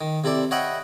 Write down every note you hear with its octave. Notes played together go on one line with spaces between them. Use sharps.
D#3
C3 E4 A4 D5
C#5 D#5 E5 F#5 G5 B5